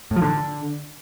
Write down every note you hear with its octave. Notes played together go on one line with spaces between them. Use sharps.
A2
F3
D3